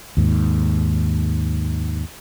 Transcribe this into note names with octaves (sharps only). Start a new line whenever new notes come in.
D#2 G#2